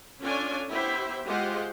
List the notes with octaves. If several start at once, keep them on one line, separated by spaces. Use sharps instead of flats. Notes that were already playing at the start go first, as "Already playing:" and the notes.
C#4 D4 F4 A4 C#5 G#5
B3 E4 G4 C5 E5
G#3 F4 G4 C5 F#5